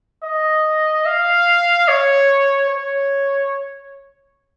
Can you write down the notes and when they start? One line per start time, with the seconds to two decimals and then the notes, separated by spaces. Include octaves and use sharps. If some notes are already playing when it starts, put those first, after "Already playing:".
0.23 D#5
1.06 F5
1.88 C#5
2.70 C#5